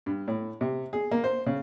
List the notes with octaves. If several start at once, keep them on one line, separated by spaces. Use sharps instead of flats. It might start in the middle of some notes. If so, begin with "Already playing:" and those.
G2
A2
C3
G#4
A#3
C5
C#3